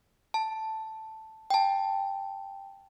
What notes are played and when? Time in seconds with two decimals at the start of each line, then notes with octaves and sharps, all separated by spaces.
0.34 A5
1.50 G5 A5